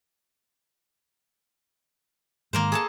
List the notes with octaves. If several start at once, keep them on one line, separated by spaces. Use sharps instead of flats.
G#2 D#3 A#3 A#4 C5
G#4 A4 A5